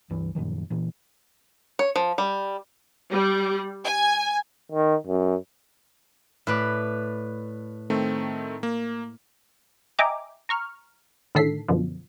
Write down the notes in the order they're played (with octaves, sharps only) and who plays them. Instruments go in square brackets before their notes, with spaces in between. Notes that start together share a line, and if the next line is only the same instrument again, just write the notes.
[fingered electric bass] C#2 G2 E3
F#2 A#2 D#3 F3
A#2 E3
[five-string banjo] C#5
F3
G3
[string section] G3
G#5
[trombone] D#3
F#2
[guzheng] A2 B4 D5
[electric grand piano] D#3 A3 C4
A#3
[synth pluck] D#5 E5 G5 G#5 A#5 D6
A#5 C#6 F6
A2 D3 D#3 A4 B6 C7
F#2 B2 D3 F3